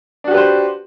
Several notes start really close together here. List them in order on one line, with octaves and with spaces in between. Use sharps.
D4 F#4 G4 B4 C5